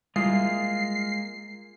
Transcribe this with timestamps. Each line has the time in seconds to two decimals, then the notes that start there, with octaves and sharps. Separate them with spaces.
0.16 G3 G#3 A#3 E4 F4 C7